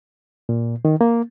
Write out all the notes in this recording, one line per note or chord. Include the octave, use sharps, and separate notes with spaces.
A#2
D#3
A#3